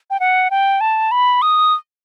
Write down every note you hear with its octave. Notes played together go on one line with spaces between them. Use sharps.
G5
F#5
G5
A5
B5
D#6